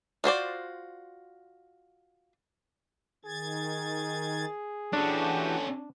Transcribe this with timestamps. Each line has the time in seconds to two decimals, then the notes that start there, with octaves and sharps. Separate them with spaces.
0.24 F4 F#4 C5 D5
3.25 D#3 G#4 G#6 A6
4.93 E3 C#4 D4 F#4 G4 A4